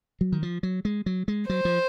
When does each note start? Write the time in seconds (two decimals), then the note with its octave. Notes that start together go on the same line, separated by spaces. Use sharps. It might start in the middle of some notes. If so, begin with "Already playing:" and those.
0.21 F#3
0.32 D#3
0.43 F3
0.63 F#3
0.85 G#3
1.06 F#3
1.28 G#3
1.49 F#3 C5
1.65 F3